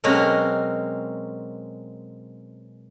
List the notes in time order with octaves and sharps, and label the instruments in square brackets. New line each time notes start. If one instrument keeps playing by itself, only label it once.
[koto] B2 F#3 G#3 A#3 C4 C#4